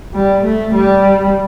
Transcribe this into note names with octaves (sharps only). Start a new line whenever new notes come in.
G3
A3
G3